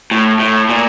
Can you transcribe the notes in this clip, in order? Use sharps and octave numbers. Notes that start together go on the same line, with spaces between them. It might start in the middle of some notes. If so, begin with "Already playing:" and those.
A2
A2
A#2